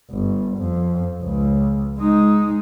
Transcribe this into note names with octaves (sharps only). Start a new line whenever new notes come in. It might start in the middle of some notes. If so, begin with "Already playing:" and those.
G1
F2
C#2
G#3 D#4